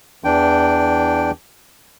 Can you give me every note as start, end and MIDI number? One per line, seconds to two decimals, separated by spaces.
0.24 1.31 40
0.24 1.31 52
0.24 1.31 62
0.24 1.31 79